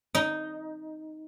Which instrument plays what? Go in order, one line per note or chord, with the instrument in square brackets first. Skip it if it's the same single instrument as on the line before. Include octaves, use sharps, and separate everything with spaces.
[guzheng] D#4